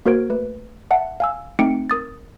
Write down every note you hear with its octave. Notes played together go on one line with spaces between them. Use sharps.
A#3 F#4 A#4 C5 G#6 D7
A3 B4
E5 F#5 A5
F5 G#5 E6
A3 C4 D#4 G5 C#7 D7
A#4 D#6 A6